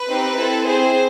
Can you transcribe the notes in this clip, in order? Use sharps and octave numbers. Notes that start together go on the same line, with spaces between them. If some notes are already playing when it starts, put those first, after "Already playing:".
Already playing: B4
C4 D#4 G4
C4 E4 A4
C4 E4 G#4 C5